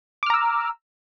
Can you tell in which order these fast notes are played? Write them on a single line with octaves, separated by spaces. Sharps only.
D6 F6 A#5 E6